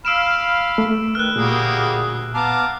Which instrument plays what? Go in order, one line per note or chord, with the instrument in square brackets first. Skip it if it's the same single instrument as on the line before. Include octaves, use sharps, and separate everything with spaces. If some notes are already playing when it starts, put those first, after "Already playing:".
[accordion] F5 B5 F6 [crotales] E6 D7 E7
[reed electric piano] A3
[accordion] D#3 B4 [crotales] F6 F#6
[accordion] D2 G#4 [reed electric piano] A#2 [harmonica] G3 A#3 F#4
[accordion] B3 D6 [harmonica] F5 A5 A#5